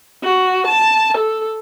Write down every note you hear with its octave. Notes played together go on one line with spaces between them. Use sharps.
F#4
A5
A4